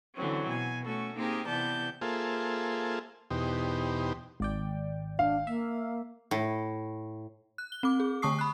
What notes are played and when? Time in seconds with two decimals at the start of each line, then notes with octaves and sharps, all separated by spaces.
0.14 D3 E3 F#3 C4 C#4
0.47 B2 G#5
0.85 A3 C#4 F#4 A4
1.15 A#3 C4 D#4 G4 G#4 A#4
1.46 C3 E3 B3 D5 A5 G6
2.01 A#3 F4 G#4 A4 C5 E5
3.30 E2 B2 D#4 G4 C5
4.40 G#1 D5 G5
5.19 D4 F5
5.47 A#3 E5
6.31 A2
7.58 F#6
7.72 G7
7.83 C4 D6
8.00 G#4
8.22 D3 A3 A5 C#6 D#6 C7
8.39 B5 F#6